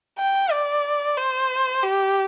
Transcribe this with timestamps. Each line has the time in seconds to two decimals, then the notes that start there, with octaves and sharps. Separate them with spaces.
0.19 G5
0.52 D5
1.18 C5
1.84 G4